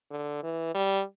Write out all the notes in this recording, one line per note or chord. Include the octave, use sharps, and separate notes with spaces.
D3
E3
G3